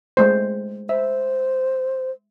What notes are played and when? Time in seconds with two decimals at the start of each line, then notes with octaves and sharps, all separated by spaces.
0.17 G#3 A3 C5
0.89 C5 E5